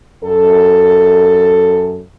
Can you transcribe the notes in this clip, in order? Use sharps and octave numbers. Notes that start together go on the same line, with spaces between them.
F#2 A4